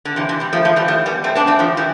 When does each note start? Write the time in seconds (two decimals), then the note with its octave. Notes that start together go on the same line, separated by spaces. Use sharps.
0.05 D3
0.16 C3 E3
0.29 C3
0.40 G3 B3
0.53 F3 A3
0.65 F3 A3
0.76 E3 G3
0.88 F3 A3
1.06 G3 B3
1.24 A3 C4
1.35 B3 D4
1.47 A3 C4
1.59 F3 A3
1.77 E3 G3